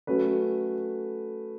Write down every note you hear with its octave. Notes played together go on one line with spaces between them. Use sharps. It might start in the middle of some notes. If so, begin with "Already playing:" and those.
F#3 A3 C#4 F#4 B4